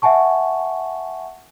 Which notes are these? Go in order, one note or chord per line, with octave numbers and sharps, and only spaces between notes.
E5 F#5 G#5 A5 C#6